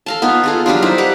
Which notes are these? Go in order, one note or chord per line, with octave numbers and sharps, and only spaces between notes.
A4 F5 A5
B3 D#4 F4 C#5
F4 G#4 A4
F#3 G3 D4 F4
D#4 E4 C5
G4 B4 F#5